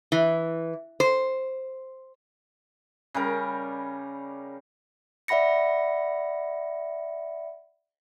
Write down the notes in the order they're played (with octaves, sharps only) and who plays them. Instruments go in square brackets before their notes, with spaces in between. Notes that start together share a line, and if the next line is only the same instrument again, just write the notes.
[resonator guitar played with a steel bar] E3
C5
[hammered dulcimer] C#3 G3 A#4
[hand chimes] D5 E5 F#5 B5 A#6 C#7